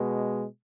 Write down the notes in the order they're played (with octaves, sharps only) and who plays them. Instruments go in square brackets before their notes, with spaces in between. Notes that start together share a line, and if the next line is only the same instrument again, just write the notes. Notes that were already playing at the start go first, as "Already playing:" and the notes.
Already playing: [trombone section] B2 G#3